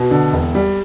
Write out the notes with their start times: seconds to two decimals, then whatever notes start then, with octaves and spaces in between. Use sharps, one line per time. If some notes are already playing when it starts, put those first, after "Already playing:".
Already playing: B2
0.11 D3
0.33 E1
0.55 G3